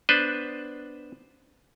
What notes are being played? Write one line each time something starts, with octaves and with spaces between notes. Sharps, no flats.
B3 D4 B4 C5